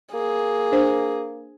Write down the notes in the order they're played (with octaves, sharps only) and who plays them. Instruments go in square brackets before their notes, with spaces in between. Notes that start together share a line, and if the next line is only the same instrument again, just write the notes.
[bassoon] A#3 [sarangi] G#4
[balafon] D4 C5